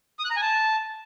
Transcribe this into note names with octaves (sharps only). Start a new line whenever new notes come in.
D#6
F#6
A#5
G#5
A5